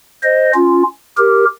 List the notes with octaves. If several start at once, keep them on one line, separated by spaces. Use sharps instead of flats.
C5 D#5
C#4 F4
G4 A#4